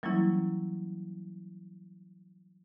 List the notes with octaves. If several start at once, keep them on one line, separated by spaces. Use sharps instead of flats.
E3 F#3 G3 A#3 C#4 E4